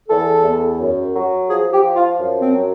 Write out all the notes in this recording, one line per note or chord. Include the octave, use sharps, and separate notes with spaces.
E2 A4
E2
F#2
F#3
F3 G#4
G4
F3
F4
F#2
C4
F#3